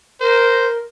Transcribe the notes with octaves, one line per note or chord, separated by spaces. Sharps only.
A#4 C5